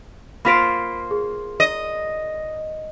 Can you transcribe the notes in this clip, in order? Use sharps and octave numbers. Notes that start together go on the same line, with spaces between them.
A#3 F4 C5 B5 B6 D7
G#4
D#5